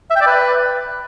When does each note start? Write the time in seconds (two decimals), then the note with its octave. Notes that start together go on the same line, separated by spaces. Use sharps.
0.10 E5
0.16 G5
0.21 D5
0.27 B4